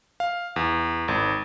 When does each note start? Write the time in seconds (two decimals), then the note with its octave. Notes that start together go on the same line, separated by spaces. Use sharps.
0.20 F5
0.56 E2
1.08 G#1